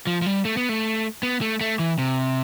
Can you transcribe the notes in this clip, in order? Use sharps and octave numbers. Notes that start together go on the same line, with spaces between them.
F3
F3
G3
A3
B3
A3
B3
A3
A3
E3
C3